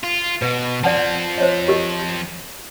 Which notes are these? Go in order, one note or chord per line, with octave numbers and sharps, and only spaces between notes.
F4
B2 B4
F3 C4 D5 F#5 A5
C5 C#5 D#5
G4 A#4 D#5